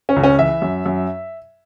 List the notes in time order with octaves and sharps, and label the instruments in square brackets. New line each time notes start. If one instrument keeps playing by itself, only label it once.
[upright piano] C#4
C#2
C#4
E3 E5
F#2
F#2